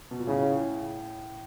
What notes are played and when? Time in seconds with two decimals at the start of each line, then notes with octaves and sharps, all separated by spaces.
0.11 B2
0.19 A#2
0.27 A2 C#3